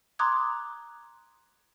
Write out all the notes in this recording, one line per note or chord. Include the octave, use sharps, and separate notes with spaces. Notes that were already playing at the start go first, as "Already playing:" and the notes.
A#5 C6 D6 D#6 F#6 G#6